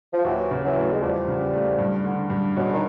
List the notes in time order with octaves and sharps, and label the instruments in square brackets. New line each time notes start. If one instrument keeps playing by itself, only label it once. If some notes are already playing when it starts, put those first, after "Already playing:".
[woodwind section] F3
[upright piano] D#2 [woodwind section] E3 F#3
[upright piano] C#3
[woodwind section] E3 F#3
[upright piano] A3
[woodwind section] G#3
[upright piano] E2 [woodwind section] F3 G3
[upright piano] C#3
A3
G2
D3
G2
[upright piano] B2 [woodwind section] F#3 G#3
[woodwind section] D3
D#3